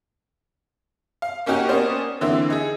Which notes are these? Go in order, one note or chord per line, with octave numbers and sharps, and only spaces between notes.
F5
A#3 C#4 D#4 F#4 G4 A#4
A#3 B3 C#4 C5 D5
D3 E3 A#3 C4 E4
D#4 G#4